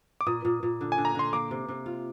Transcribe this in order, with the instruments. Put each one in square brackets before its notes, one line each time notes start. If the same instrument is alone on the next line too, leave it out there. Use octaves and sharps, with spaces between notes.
[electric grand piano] D6
[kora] A#2 [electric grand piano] D#6
[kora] A#2
A#2
D3
[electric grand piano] G#5
[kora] D3
[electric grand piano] A#5
[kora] D3 [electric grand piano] C6
[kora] A#3 [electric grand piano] D6
[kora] C3
C3
F4